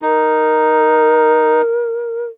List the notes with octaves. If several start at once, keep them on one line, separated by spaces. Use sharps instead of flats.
D#4 A#4